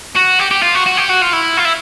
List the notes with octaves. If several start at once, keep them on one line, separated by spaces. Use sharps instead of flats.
F#4
G4
G4
F4
F#4
F#4
G4
F#4
F4
E4
F4
E4